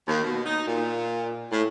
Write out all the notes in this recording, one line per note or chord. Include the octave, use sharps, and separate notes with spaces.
D#2
B2
D#4
A#2
A2